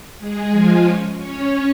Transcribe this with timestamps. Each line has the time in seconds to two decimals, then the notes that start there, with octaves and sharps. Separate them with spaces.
0.19 G#3 G#4
0.51 F3 F4
0.85 C#4 C#5
1.18 C#4 C#5